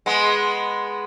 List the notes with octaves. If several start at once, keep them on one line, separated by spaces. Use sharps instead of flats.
G#3 B3